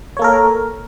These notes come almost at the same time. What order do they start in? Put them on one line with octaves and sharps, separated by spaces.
C#5 A#3 A4 A#4